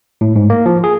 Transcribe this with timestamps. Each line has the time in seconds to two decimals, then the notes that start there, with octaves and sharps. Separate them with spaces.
0.21 A2
0.36 G#2
0.50 A#3
0.66 F3
0.84 G#4